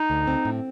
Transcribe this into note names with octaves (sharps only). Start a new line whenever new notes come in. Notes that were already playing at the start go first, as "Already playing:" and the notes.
Already playing: D#4
D2
C4
A2